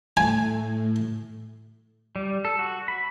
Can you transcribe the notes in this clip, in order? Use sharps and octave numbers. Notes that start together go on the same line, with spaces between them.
A2 A3 G#5
G3
A4
F#4
B5